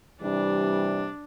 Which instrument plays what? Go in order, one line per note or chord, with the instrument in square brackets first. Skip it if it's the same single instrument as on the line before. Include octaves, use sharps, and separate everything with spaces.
[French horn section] C3 E3 G3 [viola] D4